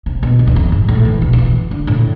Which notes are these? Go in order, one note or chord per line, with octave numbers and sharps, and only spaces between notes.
C3
B2
F2
E2
F2
G#2
A2
E3
B2
F3
E3
D3
A2